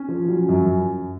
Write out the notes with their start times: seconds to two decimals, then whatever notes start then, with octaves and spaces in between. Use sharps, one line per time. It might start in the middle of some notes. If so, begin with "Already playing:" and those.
Already playing: C#4
0.08 F3
0.28 F#3
0.49 F#2